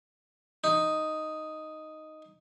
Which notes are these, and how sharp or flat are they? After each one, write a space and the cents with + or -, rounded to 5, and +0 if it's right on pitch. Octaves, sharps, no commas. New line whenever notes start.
D#4 +0